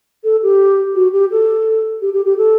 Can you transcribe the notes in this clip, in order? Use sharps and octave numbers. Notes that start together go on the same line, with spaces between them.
A4
G4
F#4
G4
A4
G4
G4
G4
A4